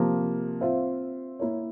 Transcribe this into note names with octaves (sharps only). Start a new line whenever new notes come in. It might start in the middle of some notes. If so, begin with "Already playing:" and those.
Already playing: C3 F3 A#3
C4 F4 C5 E5
A#3 E4 A#4 C#5